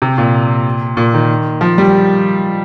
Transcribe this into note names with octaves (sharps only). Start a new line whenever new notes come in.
C3
A#2
A#2
D#3
F3
G3